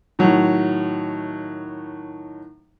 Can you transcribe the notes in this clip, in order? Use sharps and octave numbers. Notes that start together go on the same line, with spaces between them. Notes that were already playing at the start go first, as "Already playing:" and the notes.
A2 D#3 F#3